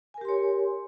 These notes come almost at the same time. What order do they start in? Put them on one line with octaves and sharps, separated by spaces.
G#5 A#4 G4 C6 C#5